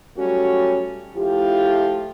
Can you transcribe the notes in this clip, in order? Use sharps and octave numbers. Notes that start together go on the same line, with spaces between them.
F#3 G3 A3 C#4 F#4
F3 A3 E4 F4 G4